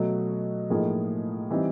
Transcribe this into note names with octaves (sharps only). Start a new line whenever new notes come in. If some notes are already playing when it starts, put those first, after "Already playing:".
Already playing: B2 F#3 A3
A2 F3 A#3 D#4 G#4
E3 G3 C4 D#4